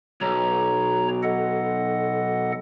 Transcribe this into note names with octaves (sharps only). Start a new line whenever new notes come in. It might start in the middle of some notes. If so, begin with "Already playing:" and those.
B1 C#5 A#5
A4 D#5 F#5